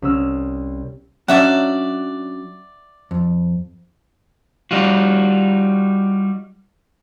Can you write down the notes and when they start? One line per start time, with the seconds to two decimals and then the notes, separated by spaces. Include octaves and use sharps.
0.02 C2 C#4 E6 F6
1.28 F#3 C#4 D4 D5 E5 F#5
3.11 F2
4.71 G3 D#4 F4 F#4